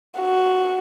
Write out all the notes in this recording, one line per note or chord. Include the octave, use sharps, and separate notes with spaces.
F#4